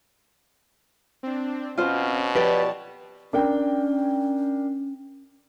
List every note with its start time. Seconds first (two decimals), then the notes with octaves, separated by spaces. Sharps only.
1.23 C4 D4
1.78 B2 C4 C#4 F4 C5
2.35 F3 G4 B4 C#5 D5 G5 A5
3.33 C#4 D4 A#4 G5